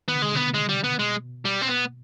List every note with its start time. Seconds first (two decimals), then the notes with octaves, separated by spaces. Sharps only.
0.08 D#3 B3
0.15 D3
0.22 C3 G#3
0.31 B2 D3 B3
0.54 G#3
0.69 G3
0.84 B3
0.99 B2 G#3
1.45 G3
1.62 C4
1.68 B3